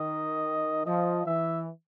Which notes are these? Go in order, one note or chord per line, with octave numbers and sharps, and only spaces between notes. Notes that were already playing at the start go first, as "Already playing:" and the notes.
Already playing: D#3 D#5
F3 D#5
E3 E5